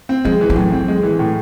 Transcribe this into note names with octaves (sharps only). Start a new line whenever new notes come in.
C4
F3 G#3
E3
F3
A2 F#3
C4
G#3
E3
A2